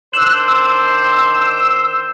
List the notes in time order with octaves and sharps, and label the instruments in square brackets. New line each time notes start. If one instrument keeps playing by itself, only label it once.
[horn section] D#3 D4 C5 [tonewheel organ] E6 F#6
[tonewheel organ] E6